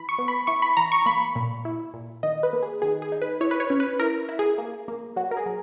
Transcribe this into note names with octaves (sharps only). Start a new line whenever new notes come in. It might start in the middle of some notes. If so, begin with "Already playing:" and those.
Already playing: E3 B5
C#6
B3
B5
E4 C#6
B5
E3 A#5
C#6
A#3 B5
A#2
E4
A#2
D#3 D#5
B4
A#3
G#4
D#3 G#4
G#4
D#4
B4
E4 C#5
B4
C#5
C#4
B4
E4 A#4
E4
G#4
A#3
A#3
F#3 F#4
A#4
G#4
F#3